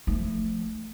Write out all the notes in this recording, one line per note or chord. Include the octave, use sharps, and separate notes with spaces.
F3 A3